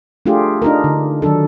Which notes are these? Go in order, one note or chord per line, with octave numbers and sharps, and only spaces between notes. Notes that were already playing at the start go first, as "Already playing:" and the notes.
A3 D4 F4 G4 G#4
D4 D#4 F4 A#4
D3
D#3 F#3 D4 A4